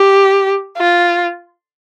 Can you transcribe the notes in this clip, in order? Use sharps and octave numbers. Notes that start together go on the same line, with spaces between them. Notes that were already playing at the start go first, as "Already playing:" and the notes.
Already playing: G4
F4